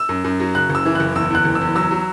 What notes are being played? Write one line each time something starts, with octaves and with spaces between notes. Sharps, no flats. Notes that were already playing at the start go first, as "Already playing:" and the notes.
Already playing: E6
F#2
F#2
F#3
C#3 F#6
F#1
E6
E3
F#1 F#6
E2 E6
E2 F#6
F#1
E6
E2
F#3 E6
F#3